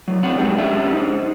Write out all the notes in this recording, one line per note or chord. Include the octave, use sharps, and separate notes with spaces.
A2 F#3
F#3 C4 D4 C#5 F#5
F#3 G#3 D4 D#4 G4
D3 C#4 D4 F4 G4 E5
D#4 C5